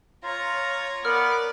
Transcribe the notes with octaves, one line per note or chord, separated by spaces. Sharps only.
F4 C#5 A#5
B3 A#4 D5 F6